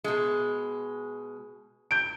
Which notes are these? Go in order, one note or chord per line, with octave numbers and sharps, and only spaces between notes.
B2 G#3
G6 D7